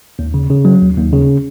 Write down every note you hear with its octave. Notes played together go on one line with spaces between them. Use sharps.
D#2
C#3
C#3
F#3
D#2
D#2
C#3